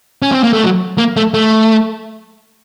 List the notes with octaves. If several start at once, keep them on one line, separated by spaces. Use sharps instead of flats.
C#4
C4
A#3
A3
F#3
A#3
A3
A3